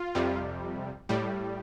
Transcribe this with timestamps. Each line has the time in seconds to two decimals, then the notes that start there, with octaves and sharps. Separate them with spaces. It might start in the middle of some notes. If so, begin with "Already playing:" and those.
Already playing: F4
0.15 F2 C3 G3
1.09 A2 G3